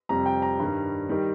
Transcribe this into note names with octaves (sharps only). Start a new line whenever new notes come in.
F2 C3 G3 A#5
G5
A#5
G2 D#3 G3
D#3 G3